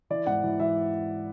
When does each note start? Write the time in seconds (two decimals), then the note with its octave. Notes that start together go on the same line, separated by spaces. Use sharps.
0.10 E3 D5
0.26 G#2 F#5
0.43 E3
0.60 E3 E5